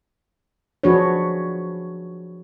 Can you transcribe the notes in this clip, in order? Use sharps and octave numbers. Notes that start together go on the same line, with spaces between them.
F3 D4 F#4 G#4 B4 C#5